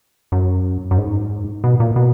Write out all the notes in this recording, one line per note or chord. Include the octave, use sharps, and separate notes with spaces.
F#2
F#2
G#2
B2
A#2
B2